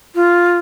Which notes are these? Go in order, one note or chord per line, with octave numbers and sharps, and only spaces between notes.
F4